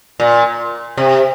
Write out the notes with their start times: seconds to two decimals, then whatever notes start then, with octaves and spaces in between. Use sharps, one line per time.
0.20 A#2
0.97 C3